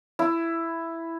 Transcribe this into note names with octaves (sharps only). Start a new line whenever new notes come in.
E4